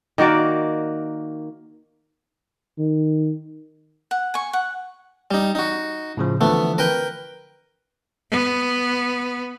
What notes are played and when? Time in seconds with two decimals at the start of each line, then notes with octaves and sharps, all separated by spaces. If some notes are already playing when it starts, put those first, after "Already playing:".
0.18 D#3 A#3 F#4 D5
2.78 D#3
4.11 F#5
4.34 G#5 C#6
4.53 F#5
5.31 G3 D#4
5.55 D#4 F#4
6.17 A2 C#3 F3
6.41 D3 E3 F3 A3 B3
6.78 A#4 B4 G5
8.31 B3